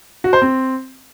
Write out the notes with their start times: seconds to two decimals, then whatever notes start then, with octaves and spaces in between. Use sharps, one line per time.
0.24 F#4
0.33 C5
0.42 C4